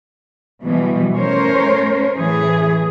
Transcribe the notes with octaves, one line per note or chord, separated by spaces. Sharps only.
B2 E3 F3 G3
A3 C#4 A#4 C5 C#5
A2 E3 G#4